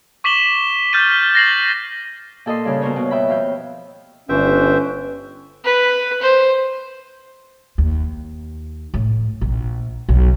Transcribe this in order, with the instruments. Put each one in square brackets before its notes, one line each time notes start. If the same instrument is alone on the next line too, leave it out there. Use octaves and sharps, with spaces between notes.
[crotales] C#6 D6 B6 E7 F#7 G7
F6 G6 A6 B6 D#7
A#6 C7 F#7
[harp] A#2 A4 D#5 C6
G2 C#3
B2 A#4 C5 C#5
B2
E5 G5 B5
F2 F5 G6
[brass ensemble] G1 [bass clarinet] C#4 [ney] B4 [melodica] C5 E5 G5
[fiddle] B4
C5
[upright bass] D#2
A2
A#1
B1